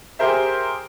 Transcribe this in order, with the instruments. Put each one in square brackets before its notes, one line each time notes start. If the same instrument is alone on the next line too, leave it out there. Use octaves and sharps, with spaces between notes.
[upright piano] G4 G#4 A#4 C5 E5